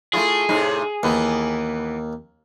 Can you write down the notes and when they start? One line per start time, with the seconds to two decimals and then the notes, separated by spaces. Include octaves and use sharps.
0.13 A3 E4 F4 G#4
0.49 A2 C3 D#4
1.03 D#2 E3 B3